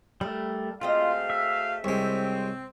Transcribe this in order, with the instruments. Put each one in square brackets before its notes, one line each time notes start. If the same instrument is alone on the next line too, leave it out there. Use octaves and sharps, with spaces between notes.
[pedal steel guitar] G3 A3 [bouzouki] A#4
[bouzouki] G#3 C4 D#5 [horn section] A3 F#4 F5 [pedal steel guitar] F4
[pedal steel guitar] E5
[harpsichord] C2 G#3 [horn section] C4 [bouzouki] C#5